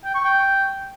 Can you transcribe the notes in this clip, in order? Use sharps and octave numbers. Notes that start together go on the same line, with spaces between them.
G5
C#6
G5